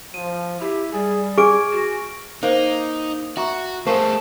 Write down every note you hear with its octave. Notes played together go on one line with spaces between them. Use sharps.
F3 D#7
E4 G4
G3 G#4
G#4 G#5 C#6 F6 D7
F#4
A#3 D#4 C5
F#4 E5 A#5 C#6
A3 G#4 A#4 C5 F5 A5 C#6